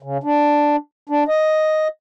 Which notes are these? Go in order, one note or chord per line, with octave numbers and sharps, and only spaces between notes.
C#3
D4
D4
D#5